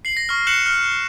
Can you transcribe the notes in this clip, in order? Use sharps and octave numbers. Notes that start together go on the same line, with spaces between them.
C7 F#7
A#6
C#6 F6
F#6 C#7 E7 F#7
F6